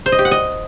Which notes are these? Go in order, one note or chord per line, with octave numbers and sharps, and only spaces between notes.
C5
D#5
G4
F#5
D#5